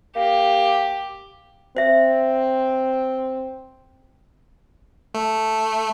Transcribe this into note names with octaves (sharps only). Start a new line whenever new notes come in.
A#3 G4
C4 C5 E5
A3